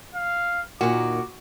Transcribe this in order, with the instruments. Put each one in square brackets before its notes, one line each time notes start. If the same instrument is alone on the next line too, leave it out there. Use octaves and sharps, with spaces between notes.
[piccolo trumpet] F5
[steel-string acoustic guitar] A#2 D#3 [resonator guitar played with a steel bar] F#4 [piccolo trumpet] D6